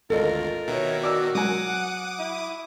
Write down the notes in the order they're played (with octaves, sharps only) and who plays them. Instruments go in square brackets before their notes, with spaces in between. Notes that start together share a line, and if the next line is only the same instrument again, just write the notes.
[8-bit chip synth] G#1 D2 [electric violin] F4 [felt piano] A4 D#5 [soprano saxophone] A#4
[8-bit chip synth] B2 D#3 [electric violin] C#5 E5
[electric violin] F#4 [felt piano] D5 D6 E6
[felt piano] F#3 G#5 [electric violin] F#5 [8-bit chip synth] D6 D#6
[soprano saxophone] E4